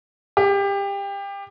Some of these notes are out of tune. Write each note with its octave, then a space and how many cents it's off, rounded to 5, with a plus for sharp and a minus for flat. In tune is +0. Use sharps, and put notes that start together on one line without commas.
G4 +25